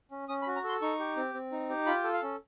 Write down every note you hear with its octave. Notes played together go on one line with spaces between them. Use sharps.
C#4
C#4 D#6
B5
F#4
A#5
A4 C6
D#4 C#6
G4
C4
C4
D#4
G4
F4 B5
A4
F5
C#4